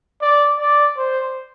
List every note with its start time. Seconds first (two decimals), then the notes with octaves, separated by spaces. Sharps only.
0.21 D5
0.60 D5
0.97 C5